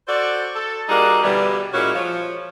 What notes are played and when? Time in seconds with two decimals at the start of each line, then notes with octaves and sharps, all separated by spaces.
0.08 F#4 A4 C5 D5
0.55 A4
0.88 G3 A#3 D4 D#4 F#4 G#4
1.23 B2 D3 E3 G3
1.73 A#2 G#3 C#4 E4 F#4 C#5
1.94 F3 C#5